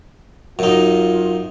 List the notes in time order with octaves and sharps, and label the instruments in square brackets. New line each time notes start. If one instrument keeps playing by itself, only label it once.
[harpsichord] F#2 D#4 [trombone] F4